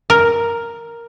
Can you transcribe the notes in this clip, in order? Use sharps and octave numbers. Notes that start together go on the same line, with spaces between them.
A#4